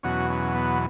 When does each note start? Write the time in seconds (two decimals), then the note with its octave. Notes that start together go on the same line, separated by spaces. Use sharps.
0.03 E2 B2 F#3 C#4 F#4
0.30 C#4
0.55 B3